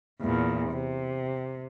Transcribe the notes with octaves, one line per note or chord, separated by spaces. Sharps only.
E2 A#2
C3